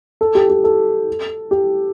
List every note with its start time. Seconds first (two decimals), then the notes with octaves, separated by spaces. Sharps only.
0.21 A4
0.35 G4
0.49 G4
0.64 A4
1.51 G4